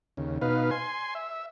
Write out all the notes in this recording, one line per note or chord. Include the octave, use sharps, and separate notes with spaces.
D#2 C#3
B2 D#4 B4 F5
G#5 C6
E5